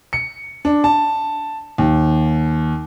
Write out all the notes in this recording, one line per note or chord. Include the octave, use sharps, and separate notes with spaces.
C#7
D4
A5
D#2